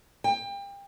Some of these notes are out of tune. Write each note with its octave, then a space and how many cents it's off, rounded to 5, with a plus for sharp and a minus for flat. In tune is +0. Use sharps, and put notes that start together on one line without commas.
G5 +30